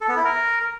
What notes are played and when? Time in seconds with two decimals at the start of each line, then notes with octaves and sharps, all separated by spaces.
0.01 A4
0.09 B3
0.17 E4
0.25 A#4